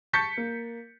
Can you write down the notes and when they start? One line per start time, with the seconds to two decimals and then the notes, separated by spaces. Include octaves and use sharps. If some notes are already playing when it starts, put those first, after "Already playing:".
0.13 A5 C#6 G6 A6 B6 C#7
0.37 A#3